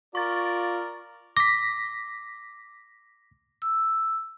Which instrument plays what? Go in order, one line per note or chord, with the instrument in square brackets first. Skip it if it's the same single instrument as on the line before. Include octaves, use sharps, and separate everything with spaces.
[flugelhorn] F4 [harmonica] A#4 D5 [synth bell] C#6 A6
[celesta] D6 [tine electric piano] A#6 B6
[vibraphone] E6